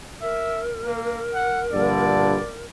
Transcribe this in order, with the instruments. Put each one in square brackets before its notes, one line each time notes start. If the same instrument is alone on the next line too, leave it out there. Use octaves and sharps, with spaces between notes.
[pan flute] A#4 [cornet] E5
[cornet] A#3
F#5
[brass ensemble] A#1 G2 D3 [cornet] D5